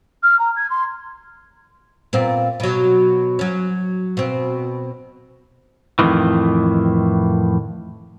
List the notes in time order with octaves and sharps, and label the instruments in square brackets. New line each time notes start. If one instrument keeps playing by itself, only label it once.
[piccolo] F6
A#5
G#6
C6
[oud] A#2 B3 C4
B2 F#3
F#3 C#4
B2 C4
[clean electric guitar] F2 A2 D#3 E3